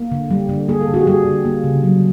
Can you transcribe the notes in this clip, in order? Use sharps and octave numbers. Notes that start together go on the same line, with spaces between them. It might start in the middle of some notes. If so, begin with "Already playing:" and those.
Already playing: A#3
D3
G3
D3
A#3 G#4
A4
D3
F#4 G#4
G4
G3 F#4 G#4
D3
A#3
C#3
F#3